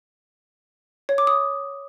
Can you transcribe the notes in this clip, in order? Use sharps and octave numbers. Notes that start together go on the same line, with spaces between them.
C#5
D6
D#6